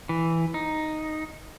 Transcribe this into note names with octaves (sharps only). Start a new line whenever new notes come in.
E3
D#4